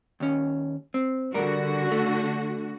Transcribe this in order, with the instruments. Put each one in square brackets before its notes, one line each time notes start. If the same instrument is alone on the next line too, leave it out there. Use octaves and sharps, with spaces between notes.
[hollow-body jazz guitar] D#2 C#4
C4
[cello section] D3 F#4 [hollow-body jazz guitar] G3 A#4
[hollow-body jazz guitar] A3